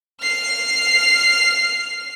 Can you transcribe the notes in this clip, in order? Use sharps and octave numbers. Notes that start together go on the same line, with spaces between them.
F6 C7